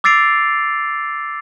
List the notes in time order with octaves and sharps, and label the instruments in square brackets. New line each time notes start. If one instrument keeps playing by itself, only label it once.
[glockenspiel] D6 E6 A6 C7 D7 F7